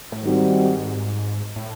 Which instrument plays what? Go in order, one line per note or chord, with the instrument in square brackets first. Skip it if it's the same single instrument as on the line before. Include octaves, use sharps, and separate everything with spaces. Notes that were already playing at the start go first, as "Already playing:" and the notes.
[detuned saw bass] A2
[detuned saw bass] G#2 [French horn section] D#3 G3 C4 D#4 F#4
[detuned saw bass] A2